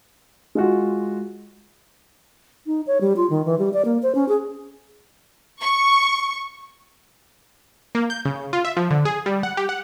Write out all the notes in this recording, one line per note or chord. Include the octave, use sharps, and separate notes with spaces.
G#3 F4 F#4
D#4
C#5
G3
F4
D#3
E3
G3
D5
A#3
C5
C#4
G#4
C#6
A#3
G6
C#3
F4
E5
F3
D3
G#4
G3
F#5
G4
F#5